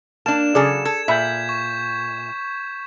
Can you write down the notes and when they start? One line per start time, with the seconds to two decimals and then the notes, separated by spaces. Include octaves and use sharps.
0.26 A#3 D4 A5 E7
0.55 C#3 F#3 G#4 A4 D5
0.85 A4 G#6
1.08 A#2 E5 B5 G6 B6
1.49 C#6